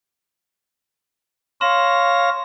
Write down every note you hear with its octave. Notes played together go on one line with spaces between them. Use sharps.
C#5 F5 C6 A#6 E7